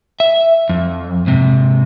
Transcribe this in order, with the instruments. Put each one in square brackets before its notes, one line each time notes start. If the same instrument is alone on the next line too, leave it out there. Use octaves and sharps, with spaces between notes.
[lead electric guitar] E5
F2
G#2 C3